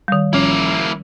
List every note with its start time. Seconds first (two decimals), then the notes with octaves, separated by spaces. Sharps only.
0.08 D#3 G3
0.33 A1 F3 A#3 C#4 E4